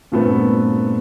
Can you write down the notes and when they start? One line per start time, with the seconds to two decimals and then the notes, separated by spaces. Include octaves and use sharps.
0.12 G2 A#2 A3 B3 C4